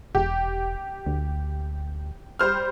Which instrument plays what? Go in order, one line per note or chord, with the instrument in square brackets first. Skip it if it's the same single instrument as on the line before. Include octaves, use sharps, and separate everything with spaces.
[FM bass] E1 [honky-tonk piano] G4
[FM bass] D2
[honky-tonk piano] G3 C5 F6